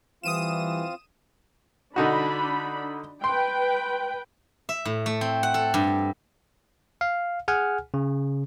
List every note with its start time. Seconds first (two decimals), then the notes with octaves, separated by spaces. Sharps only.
0.23 E3 G3 C4 F4 F5 D#6 D#7 E7
1.96 D3 D4 D#4 F#4 B5
3.24 B4 G5 C6
4.69 E5
4.85 A2
5.06 A3
5.21 C4
5.43 F#5
5.54 A4
5.74 G2
7.01 F5
7.48 G#4 F#5 G#5 F6
7.94 C#3